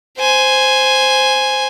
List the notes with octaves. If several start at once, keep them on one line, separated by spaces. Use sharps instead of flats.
C5 G#5